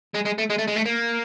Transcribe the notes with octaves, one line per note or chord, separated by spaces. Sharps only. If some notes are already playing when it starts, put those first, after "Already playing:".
G#3
G#3
A3
G#3
A3
G#3
A3
A#3